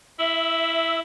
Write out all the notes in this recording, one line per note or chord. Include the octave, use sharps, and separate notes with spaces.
E4 E5 E6